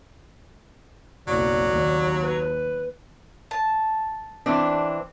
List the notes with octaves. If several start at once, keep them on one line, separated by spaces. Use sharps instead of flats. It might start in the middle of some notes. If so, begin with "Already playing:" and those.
F#1 B1 F2 F#3 D5
D#2
B4
A5
E3 C4 D4